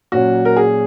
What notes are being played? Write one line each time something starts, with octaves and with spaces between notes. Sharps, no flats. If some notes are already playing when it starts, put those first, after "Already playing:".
A#2 F#3 C#4 F#4
A#4
G#4